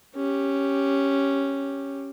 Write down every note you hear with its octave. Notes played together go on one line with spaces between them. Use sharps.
C#4 G4